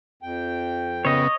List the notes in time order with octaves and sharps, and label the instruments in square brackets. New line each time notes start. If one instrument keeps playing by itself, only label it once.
[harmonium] F2 G5
[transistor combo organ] C#3 B3 [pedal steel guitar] C#5 D#5